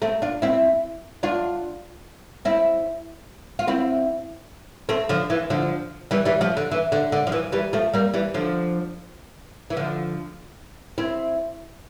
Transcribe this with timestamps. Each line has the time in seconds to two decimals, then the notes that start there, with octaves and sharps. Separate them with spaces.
0.02 A3 C4
0.22 D4 F4
0.42 C4 E4
1.23 D4 F4
2.45 C4 E4
3.59 F4
3.68 C4 E4
4.89 A3 C4
5.09 D3 F3
5.30 E3
5.50 D3 F3
6.11 E3 G3
6.25 E3 G3
6.41 F3 A3
6.57 D3
6.71 E3
6.92 D3
7.12 D3
7.27 F3
7.32 E3
7.52 E3 G3
7.73 F3 A3
7.94 G3 A#3
8.14 E3 G3
8.34 D3 F3
9.70 E3
9.77 D3 F3
10.98 C4 E4